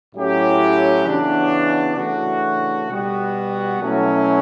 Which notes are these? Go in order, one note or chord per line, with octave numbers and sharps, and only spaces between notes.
A2 F#3 C#4 E4 G4
C#3 E3 B3 D4 F#4
C#3 E3 A3 D4 F#4
B2 G3 B3 F#4
B2 F#3 A3 C#4 E4